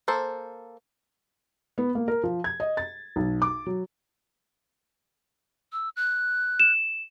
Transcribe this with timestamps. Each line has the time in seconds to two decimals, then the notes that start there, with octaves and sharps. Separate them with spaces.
0.08 A#3 A4 C5
1.78 B3
1.95 A#3
2.08 A#4
2.23 F3
2.44 G#6
2.60 D#5
2.77 A6
3.16 B1
3.42 D6
3.66 F#3
5.73 E6
5.96 F#6
6.60 E7